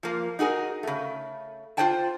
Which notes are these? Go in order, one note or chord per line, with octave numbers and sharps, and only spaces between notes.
F3 A#3
D#4 F#4 G#4 A#4
C#3 A3
F4 G4 C5 D5 G5 A5